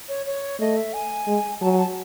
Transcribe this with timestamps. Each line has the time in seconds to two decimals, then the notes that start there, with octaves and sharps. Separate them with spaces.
0.09 C#5
0.26 C#5
0.60 A3 D#5
0.77 E5
0.93 G#5
1.27 G#3
1.61 F#3 A5
1.70 G#5
1.78 A5